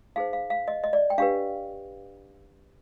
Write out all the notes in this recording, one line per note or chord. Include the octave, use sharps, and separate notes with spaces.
D#4 G#4 C5 F5
F5
F5
D#5
D#5
D5
G5
D4 G4 B4 F5